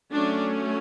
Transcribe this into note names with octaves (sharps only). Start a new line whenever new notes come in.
F#3 A3 C#4 D4